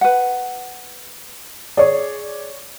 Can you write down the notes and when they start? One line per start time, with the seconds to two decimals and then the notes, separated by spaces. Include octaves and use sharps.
0.01 B4 F#5
1.77 G#4 C#5 D5